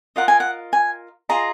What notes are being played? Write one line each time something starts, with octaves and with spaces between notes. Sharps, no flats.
F4 A#4 D#5 F#5
G#5
F#5
G#5
F4 G#4 D#5 A#5